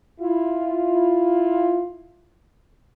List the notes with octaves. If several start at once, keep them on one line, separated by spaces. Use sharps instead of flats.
E4 F4